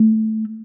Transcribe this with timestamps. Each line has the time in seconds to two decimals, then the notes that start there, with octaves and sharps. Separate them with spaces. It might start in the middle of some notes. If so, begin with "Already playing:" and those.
Already playing: A3